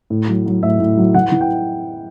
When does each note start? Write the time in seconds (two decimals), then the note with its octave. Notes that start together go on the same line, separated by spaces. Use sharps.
0.10 A2
0.28 F#3
0.46 F#3
0.63 A2 E5
0.80 A2
0.97 F#3
1.14 E3 F#5
1.32 E3
1.41 G5